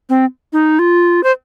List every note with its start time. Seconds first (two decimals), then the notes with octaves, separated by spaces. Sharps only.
0.09 C4
0.53 D#4
0.79 F4
1.24 C5